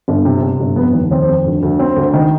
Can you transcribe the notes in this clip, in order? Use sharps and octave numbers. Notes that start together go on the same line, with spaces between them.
G1
C3
C3
G1
F1 B3 B4
D#2
D#3 C4 C5
F1
D2
D2
C4
D2
D#3